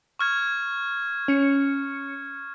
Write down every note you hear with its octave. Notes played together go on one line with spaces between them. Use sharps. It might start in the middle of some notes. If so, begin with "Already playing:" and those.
C#6 F6 G#6
C#4 C#7